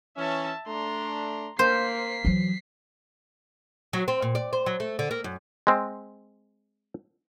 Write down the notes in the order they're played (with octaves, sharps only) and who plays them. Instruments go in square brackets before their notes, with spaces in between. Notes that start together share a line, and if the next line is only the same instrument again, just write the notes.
[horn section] E3 C#4 [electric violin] E5 A5
[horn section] A3 D4 [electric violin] A#5 C6
[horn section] A#3 [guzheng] C5 [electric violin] B6 C7
[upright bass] E3 F#3
[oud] F#3
C4
A#2
D5
C5
F#3
A3
D3
A#3
F#2
[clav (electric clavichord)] G#3 C4